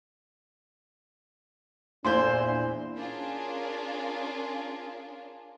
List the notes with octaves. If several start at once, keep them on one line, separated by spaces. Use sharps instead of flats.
E2 A#2 D4 E4 C5 C6 G6
C#4 D4 F4 G#4 A#4